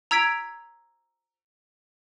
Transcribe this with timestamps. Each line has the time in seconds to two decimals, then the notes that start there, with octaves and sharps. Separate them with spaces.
0.11 A#5 E6 G#6 B6 D7 F7